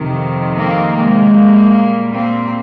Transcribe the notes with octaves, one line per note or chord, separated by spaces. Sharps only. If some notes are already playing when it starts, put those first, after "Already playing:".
Already playing: F2 C3 D#3
A#3 C4
G#3 A#3
A#2 G3
A#3 C4